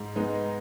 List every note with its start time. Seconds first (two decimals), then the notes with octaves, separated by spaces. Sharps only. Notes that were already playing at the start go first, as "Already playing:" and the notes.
Already playing: G#2
0.16 G#3 B3 D#4